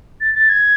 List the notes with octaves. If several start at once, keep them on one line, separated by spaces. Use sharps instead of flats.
A6
A6
G#6